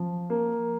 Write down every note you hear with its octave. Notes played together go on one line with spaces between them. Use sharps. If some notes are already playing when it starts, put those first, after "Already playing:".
Already playing: F3
A#3